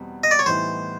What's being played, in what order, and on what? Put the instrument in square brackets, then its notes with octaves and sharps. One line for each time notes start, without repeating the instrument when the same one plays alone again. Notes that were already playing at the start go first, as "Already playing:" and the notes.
Already playing: [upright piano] E2 B2 G3 C4
[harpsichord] D#5
D5
C#5
[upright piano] A2 E3 G3 B3 D#4 [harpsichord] C5